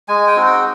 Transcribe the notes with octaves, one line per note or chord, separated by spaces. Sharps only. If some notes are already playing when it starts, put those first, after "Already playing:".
G#3 G#5
G5
C4 D#4 F#4
G5